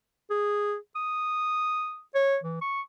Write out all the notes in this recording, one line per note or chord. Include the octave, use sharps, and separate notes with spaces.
G#4
D#6
C#5
E3
C#6